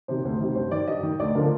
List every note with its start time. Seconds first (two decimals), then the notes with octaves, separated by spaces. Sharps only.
0.08 C3 D#3 C5
0.25 D2 C5
0.40 C3 D#3
0.55 G2 C5
0.71 D#3 D5
0.88 G2 D#5
1.03 D#3
1.19 D2 D5
1.35 D3 F3 A#4